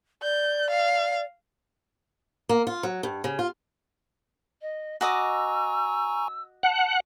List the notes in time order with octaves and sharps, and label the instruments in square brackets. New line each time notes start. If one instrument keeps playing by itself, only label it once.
[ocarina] D5 [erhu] G6
[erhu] F5
[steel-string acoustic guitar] A#3
F4
F#3
G2
C#3
F4
[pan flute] D#5
[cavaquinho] F#4 D#5 D6 [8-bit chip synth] G#5 A#5 C#6 [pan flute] E6
[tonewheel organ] F#5 [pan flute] A5